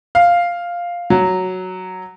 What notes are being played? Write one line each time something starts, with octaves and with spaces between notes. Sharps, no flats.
F5
F#3